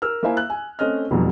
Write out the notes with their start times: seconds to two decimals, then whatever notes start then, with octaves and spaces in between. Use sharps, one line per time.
0.02 A#4 E6 F6
0.23 A#3 E4 C5 E5 F5 G#5
0.37 F#6
0.50 G#5
0.79 A3 C4 C#4 D#5 F6
1.11 F1 F2 B2 F#3 G3